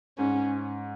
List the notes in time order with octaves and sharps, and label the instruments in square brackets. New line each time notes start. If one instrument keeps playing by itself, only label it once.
[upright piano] G#2 [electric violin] C#4